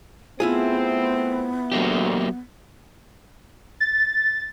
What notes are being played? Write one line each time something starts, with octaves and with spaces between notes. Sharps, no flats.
A3 B3 C4 E4 F4 G#4
D2 F#3 A#3 G4
A6